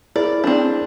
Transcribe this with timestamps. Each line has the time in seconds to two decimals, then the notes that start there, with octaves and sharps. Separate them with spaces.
0.16 E4 G#4 A#4 D5
0.44 C4 D4